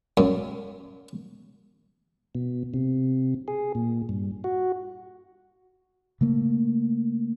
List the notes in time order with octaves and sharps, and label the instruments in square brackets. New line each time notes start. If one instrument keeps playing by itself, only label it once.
[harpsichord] F#2
[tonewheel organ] B2
C3
G#4
A#2
G2
F#4
[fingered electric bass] C#3 A3 A#3